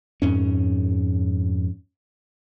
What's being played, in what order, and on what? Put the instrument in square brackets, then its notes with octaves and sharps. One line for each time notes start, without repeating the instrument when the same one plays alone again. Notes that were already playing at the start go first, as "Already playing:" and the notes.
[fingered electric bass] F2 G#2 C#4